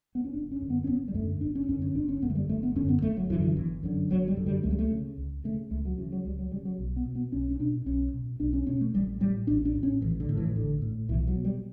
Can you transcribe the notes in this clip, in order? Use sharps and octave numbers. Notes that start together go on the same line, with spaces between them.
B3
C#4
G1 D4
C#4
F#2 D3
B3
C#4
G1 B3
G3
F#2 D3 A3
G1 D4
C#4
F#2 D3 C#4
C#4
G1 D4
C#4
F#2 D3 B3
A3
G3
G1 A3
B3
F#2 D3 C#4
B3
G1 A3
F#3
F#2 D3 E3
E3
G1 E3
F#2 D3
G1 F#3
G3
F#2 D3
G3
C#2 A3
G3
A3
C#3
C#2
C#3 A3
C#2 A3
F#3
C#3 E3
F#3
C#2 G3
F#3
C#3 G3
F#3
B1
B3
B2
B3
B1 C#4
C#4
B2 D4
B1 C#4
B2
B1 D4
C#4
B2 C#4
A3
A1 G3
A2 G3
A1 D4
D4
A2
C#4
A1 E3
D3
A2
E3
A1 D3
A2
B1 E3
F#3
B2
G3